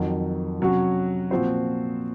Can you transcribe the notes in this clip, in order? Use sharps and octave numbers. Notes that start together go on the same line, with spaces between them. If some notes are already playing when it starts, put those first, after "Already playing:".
Already playing: F2 D#3 F#3
C3 F#3 C#4 F#4
A#2 F3 C4 F#4 C5